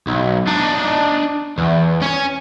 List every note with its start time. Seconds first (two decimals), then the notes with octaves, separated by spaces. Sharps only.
0.07 B1
0.47 D4 D#4
1.58 E2
2.02 C#4 C#5